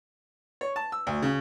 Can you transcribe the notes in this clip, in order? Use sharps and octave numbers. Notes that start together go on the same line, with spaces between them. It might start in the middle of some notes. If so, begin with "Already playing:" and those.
C#5
A5
E6
D2
C#3